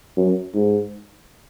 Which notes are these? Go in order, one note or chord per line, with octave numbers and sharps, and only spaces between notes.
F#2
G#2